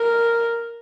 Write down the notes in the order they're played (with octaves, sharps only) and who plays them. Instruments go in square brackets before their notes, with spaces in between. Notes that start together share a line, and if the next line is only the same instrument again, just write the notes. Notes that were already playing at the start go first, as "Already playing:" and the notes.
Already playing: [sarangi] A#4